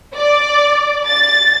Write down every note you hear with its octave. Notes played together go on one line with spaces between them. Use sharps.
D5
A6